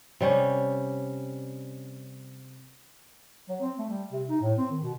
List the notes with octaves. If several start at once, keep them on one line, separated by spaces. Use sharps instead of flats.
C3 G3 C#4
F#3
C4
A3
G3
C3
D#4
A2
C4
D#3
B2